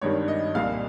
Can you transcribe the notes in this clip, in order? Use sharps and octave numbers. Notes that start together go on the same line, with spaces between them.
G#1 G2 D#3 G3 C#5
D#5
C2 A#2 G3 F5